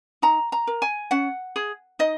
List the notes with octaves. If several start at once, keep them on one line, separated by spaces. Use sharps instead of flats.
D#4 A#5
A#5
A#4
G#5
C#4 F#5
G#4
D#4 D#5